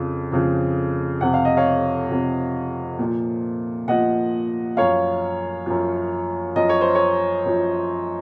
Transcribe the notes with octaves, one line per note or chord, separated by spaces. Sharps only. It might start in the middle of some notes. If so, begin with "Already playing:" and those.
Already playing: F2 C#3 F3
F2 C#3 F3
F2 C3 F3 F#5
F5
D#5
C#5 F5
F2 C3 F3
A#2 F3
A#2 F3 D#5 F#5
F#2 F3 C#5 F5
F#2 F3
F#2 F3 D#5
C#5
C5
C#5
F#2 F3